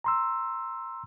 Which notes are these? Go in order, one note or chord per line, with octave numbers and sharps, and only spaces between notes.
A#5 C6 E6